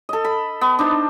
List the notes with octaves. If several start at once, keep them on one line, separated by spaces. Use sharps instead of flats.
A4 D#5
B5
B3
D4 D#4 C5